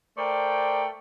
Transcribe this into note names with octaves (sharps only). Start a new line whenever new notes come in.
A3 A#4 C5 D5 G5